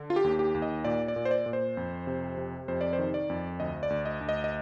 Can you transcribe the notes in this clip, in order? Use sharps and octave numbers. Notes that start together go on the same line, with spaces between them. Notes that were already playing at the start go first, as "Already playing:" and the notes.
Already playing: D3
F4
G4
D#2
G4
D#2
D#5
A#2 D5
D5
A#2
C5
D5
A#2
C5
F2
C3
C3
F2 C5
D5
C5
D#3
D5
F2
D2 D#5
D5
D2
D#5
D2
D#5
D#5